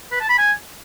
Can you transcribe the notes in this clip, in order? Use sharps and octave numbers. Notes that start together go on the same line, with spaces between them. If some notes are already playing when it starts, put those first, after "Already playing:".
B4
A5
B5
G#5